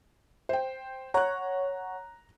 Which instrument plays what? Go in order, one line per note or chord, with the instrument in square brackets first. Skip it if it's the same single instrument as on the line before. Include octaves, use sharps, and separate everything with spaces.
[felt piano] C5 G5
[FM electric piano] C#5 F#5 [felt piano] A#5 F#6